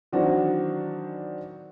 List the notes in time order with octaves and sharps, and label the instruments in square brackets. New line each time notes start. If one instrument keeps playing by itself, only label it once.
[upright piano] D#3 E3 F#3 C4 D4 F#4